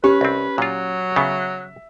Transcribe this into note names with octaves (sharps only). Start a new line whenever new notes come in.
C#4 G4 B4
C2 C4
A#2 F#3 F4
C#3 B3 E5